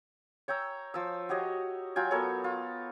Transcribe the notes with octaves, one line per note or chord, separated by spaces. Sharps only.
C#5 G5 A#5 E6
F3 E6
F#4 G4 C#5 D#5
F#3 F4 G5 G#5
B3 A4 A#4 C#5
F4